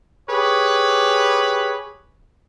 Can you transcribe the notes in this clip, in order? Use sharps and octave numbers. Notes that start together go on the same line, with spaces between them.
G4 G#4 B4 C#5